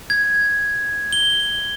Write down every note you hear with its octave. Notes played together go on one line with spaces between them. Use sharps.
G#6
G7